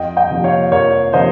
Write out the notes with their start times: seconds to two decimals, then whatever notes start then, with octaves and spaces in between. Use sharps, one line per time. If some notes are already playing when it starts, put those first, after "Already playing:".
Already playing: F2 D#5 G5
0.17 D#5 G5
0.30 C3 F3 A#3
0.44 C#5 F5
0.72 F2 A#4 C#5
1.13 C3 F3 A#3 C5 D#5